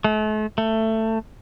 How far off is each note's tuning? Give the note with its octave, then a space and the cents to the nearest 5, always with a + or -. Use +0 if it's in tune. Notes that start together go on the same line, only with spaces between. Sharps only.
A3 -40
A3 +15